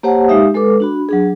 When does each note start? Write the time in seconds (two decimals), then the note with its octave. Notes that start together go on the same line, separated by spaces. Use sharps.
0.03 A#3 G4 C5 C#5 F#5 A5
0.28 G#3 D#4 G4 E5 F5 D#6
0.54 G#3 A4 B4 D6
0.80 D4 F#4 B5
1.09 F#3 D4 G#4